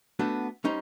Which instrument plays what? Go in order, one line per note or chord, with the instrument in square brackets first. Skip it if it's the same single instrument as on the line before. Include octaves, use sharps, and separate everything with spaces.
[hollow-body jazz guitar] A3 B3 D4 F#4
G3 C#4 D#4 C5